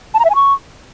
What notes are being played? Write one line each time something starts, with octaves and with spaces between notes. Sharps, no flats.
A5
A#5
E5
G#5
C#6